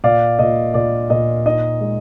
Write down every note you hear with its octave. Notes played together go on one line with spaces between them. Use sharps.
A#2 D5 F5
A#2 D#5
A#2 D5
A#2 D#5
D#4 D#5
G#3